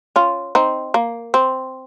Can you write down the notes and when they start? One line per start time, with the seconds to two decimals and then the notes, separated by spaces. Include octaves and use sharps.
0.16 C#4 F4
0.55 C4 D#4
0.94 A#3
1.34 C4